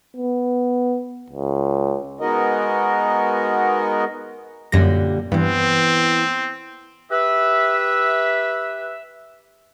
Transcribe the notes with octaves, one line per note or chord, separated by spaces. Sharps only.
B3
C#2
G#3 B3 D#4 F#4 A#4 D#5
F#2 A#2 D3 G3 A#6
G2 E3 B3 C4
G4 B4 E5